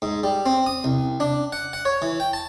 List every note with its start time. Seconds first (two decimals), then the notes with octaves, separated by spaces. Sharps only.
0.02 G#2
0.24 G3
0.46 C4
0.66 D#6
0.84 C2
1.20 D4
1.53 F#5
1.73 F#5
1.85 C#5
2.02 E3
2.20 G5
2.33 A5